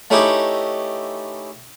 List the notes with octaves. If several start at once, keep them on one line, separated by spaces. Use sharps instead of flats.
A3 C#4 D#4 E4 G4 B4